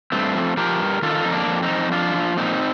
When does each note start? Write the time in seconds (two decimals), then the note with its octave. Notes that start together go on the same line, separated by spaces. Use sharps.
0.12 G2 A3 C4
0.34 F3
0.57 F3 G4 A#4
0.80 G2
1.02 D#3 F4 A4
1.15 F4
1.24 F2 D#4
1.32 A#3 D4
1.47 F2
1.63 C4 D#4
1.70 F2
1.92 F3 D4 F4
2.14 F3
2.37 A#2 C4 D#4